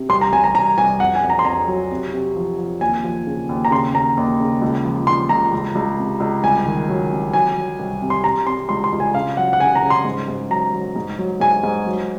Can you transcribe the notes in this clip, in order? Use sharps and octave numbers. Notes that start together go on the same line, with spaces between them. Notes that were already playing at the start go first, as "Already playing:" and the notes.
Already playing: C3
C2 C6
A#5
C2 G#5
A#5
C2 A#5
C2 G#5
F2 F#5
G#5
F2
A#5
C6
F2 A#5
F#3
C3
C3
F3
F3
D#2 G#5
F3
C#3
D#2
A#5
C#3 C6
D#2 A#5
D#2
C#3
C#2
F3
F3 C6
C#2 A#5
C#2
C#2
C3
C#2
C2 G#5
D#3
F#3
C3
F#3 G#5
F#3
C2
C3
C6
C3 A#5
C3 C6
C#2 C6
C6
C#2
G#5
C#3 F5
F#3 F#5
F#5
C#3 G#5
A#5
C#3
C6
G#2
G#2
F#3 A#5
F#3
G#2
F#3
G#2 G#5
G#2
F#3